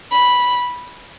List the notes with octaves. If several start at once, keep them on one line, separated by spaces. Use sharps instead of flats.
B5